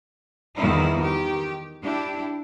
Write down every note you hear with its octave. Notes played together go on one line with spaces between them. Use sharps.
E2 D#3 F3 G3 D#4 E4
D#3 G4
D4 E4 G4